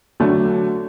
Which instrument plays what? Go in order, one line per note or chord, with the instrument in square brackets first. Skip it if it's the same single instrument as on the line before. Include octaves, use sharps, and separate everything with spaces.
[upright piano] D3 F#3 A3 D4